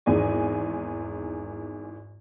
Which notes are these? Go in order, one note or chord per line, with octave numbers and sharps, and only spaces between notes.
G#1 E2 D#3 G#3 D#5 G#5